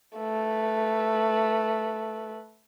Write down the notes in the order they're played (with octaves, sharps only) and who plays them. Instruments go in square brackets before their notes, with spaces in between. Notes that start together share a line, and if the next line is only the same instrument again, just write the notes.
[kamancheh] A3 B4